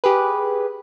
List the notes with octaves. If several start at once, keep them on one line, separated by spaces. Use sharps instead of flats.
G4 G#4 B4